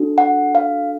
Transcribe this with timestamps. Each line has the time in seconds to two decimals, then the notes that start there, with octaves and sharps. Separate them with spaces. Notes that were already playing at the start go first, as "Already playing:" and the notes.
Already playing: D4 F#4 A4
0.18 F#5
0.55 F5